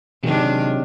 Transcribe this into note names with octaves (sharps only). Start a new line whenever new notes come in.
C3 D#3 F#3 G#3 D4